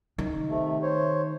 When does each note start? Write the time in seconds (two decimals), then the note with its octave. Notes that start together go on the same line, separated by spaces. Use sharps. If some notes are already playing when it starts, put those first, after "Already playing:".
0.18 D#3
0.49 C3 A3
0.83 C5 C#5